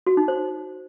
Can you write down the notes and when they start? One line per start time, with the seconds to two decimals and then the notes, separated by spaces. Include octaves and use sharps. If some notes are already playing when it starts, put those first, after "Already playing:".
0.07 F#4
0.17 D#4
0.28 C5